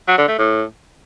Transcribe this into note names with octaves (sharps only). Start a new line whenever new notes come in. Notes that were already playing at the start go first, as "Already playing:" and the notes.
F#3
D3
A3
A2